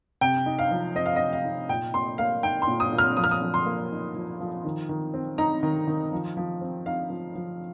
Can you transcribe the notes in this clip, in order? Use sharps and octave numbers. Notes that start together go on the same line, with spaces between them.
C3 G5
D#4
F5
F3
C4 D#5
F5
D#5
C3
F5
D#4
A#2 G5
A#2 C6
A#3 F5
D#4 G5
C6
A#2
D#6
A#2
F6
F3 D#6
F6
D#6
F3
C6
A#3
D#4
F3
F3
D#3
D#3
C4
D#4 A#5
D#3
D#3
F3
F3
C4
D#4 F5
F3
F3